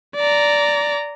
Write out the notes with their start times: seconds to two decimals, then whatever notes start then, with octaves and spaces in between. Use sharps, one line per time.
0.15 D5 A#5